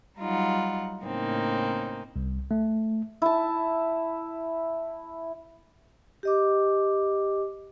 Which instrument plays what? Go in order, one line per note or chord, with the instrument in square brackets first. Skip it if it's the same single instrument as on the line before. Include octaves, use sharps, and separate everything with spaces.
[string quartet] F#3 G3 D#4 F4 F#5
A2 C#3 A#3 C4 D#4
[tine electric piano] C2
A3
[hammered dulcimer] E4 A5
[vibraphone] G4 D#5 D6